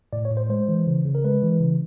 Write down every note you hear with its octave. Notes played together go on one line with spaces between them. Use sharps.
A2 D5
C#5
A2
C5
G#3 C5
E3
C#3
C#3
A#4
G#3 B4
E3
C#3